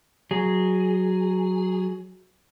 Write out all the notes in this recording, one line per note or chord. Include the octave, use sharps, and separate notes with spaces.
F#3 G#4